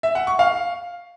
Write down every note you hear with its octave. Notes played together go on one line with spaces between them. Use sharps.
E5
F#5
C#6
F5